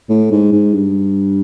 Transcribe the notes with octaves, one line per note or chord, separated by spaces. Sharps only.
A2
G#2
G#2
G2